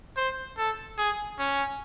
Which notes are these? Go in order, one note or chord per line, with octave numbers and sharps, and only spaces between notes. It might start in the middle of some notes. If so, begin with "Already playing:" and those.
C5
A4
G#4
C#4